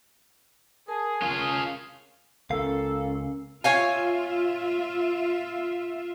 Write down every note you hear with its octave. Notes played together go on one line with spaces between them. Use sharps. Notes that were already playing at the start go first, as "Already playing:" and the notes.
G#4 A#4 A5
C#4 F4 G#4
C#2 A#3 C#4 A4 F5
F4 C#5 E5 F5 G#5